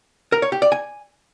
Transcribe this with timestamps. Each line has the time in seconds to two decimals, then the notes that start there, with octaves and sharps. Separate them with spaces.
0.32 A#4
0.42 C#5
0.52 G4
0.62 D5
0.72 G#5